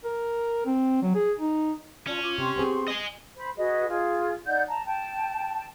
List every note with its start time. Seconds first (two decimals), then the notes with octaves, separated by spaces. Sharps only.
0.05 A#4
0.66 C4
1.02 F#3
1.15 G#4
1.39 D#4
2.07 C#4 F4 D5 A5
2.23 F4 D6
2.38 C3 G4 C6 C#6
2.56 B3 C4 G#4
2.88 D#5 G#5
3.37 C5 B5
3.57 F#4 G#4 B4 D#5
3.88 F4 G#4
4.46 D#4 D5 F#5 G6
4.68 A5 A#5
4.85 G5 A5